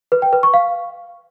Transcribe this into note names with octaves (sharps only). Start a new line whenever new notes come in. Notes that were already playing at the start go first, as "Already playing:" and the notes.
B4
G5
B4
C#6
F5